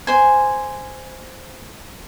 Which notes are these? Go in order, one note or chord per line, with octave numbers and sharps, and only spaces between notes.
C5 G#5